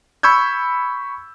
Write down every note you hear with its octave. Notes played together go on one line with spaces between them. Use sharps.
B5 C#6 E6 G6 G#6